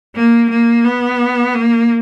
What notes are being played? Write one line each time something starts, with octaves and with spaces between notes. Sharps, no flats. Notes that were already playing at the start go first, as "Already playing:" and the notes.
A#3
A#3
B3
A#3